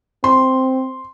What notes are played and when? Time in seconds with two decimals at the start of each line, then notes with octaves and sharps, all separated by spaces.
0.24 C4 C6